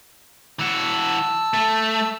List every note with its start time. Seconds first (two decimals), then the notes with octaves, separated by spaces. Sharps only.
0.59 E3 F#4 A5 E6
1.54 A3